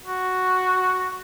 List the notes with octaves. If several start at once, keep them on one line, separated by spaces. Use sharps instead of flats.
F#4